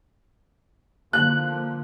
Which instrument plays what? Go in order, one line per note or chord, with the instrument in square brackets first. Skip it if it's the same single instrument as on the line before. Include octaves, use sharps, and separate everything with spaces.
[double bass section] D3 F3 A#3 [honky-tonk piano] F#6